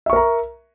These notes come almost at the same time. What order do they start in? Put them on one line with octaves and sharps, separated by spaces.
E5 C#6 A#4 A#5